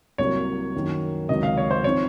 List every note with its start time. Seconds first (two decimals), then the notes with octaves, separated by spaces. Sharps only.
0.18 C2 C3 F#3 A#3 C#5
0.75 F#2 D#3 A#3 C#4 F#4
1.29 C#2 C3 D#3 F#3 C#4 D#5
1.43 F5
1.58 C#5
1.71 C5
1.84 F3 C4 D#4 C#5